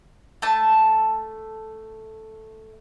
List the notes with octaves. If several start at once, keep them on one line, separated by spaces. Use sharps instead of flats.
A3 A5